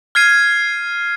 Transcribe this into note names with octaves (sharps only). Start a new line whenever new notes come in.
F6 G#6 C7 D#7